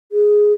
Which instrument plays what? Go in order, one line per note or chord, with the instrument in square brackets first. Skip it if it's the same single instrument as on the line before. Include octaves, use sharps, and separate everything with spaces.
[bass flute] G#4